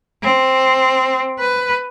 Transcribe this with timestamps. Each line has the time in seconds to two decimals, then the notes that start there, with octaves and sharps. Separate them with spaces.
0.23 C4
1.40 B4